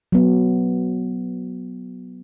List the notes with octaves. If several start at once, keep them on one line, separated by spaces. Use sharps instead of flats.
F#3 B3